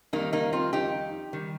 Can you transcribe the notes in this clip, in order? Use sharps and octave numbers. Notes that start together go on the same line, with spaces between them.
F2 D#3 G3 A#3 D#4
A#3 D#4
C4 F4
D#4 G4
D#3 G3